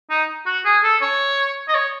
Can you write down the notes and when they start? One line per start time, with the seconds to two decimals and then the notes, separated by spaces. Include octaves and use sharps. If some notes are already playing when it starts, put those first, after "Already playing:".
0.10 D#4
0.46 F#4
0.65 G#4
0.83 A4
1.02 C#5
1.68 D#5
1.75 C#5